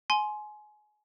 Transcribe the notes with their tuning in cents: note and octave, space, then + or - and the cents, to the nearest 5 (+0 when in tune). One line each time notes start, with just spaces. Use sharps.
G#5 +25 C6 +0